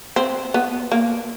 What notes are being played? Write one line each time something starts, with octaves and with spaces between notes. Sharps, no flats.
C4
B3
A#3